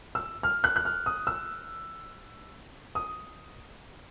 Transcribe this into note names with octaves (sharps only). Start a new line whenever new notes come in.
E6
F6
F#6
F#6
F6
D#6
E6
D#6